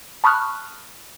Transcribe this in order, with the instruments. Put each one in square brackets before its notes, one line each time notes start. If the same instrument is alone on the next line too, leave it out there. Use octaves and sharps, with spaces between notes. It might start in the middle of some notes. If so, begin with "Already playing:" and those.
[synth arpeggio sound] A5 B5 C#6 D#6 F6 F#6